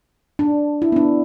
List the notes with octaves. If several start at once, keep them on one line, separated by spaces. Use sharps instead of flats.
D4
E4
B3
D4